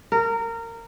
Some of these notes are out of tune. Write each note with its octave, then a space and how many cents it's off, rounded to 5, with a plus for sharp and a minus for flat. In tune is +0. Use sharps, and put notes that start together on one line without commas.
A#4 -20